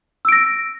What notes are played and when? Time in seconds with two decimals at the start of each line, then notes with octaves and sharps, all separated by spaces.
0.25 E6
0.29 D7
0.32 A#6